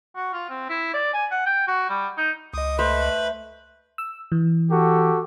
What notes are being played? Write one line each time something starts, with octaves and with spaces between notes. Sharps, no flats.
F#4
F4
C4
E4
D5
G#5
F#5
G5
F#4
G3
D#4
C#2 D#5 D#6
A3 B4 C5 B5
E6
E3
F#4 G4 A4